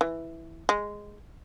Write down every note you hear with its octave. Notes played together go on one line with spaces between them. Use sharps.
E3
G#3